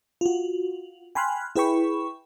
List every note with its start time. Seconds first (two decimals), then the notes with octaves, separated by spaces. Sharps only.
0.21 F4 F#4
1.15 G5 G#5 B5 C6 F6 F#6
1.56 E4 G#4 B4 G5 B5 C#6